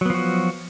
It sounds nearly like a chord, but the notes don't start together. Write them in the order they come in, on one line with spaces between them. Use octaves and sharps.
F#3 B3 F3 F#4